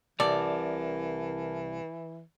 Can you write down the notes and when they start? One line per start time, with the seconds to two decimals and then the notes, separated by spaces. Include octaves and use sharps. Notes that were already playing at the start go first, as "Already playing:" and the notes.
0.20 C2 E3 A#4 D5 A5